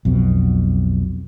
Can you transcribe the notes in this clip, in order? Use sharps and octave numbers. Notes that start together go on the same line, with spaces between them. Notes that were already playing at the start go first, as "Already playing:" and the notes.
B1 F2 B2